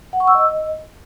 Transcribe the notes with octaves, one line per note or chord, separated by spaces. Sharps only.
F#5
C#6
E6
D#5